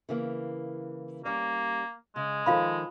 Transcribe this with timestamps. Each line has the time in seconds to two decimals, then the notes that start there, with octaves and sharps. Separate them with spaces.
0.09 C#3 E3 A#3
1.25 G3 A#3 C#4 D5
2.16 C#3 G#3
2.46 D#3 F3 F4 A4 F5 B5